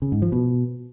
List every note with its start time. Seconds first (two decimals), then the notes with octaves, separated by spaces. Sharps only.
0.02 C#3
0.12 G#2
0.22 F3
0.32 B2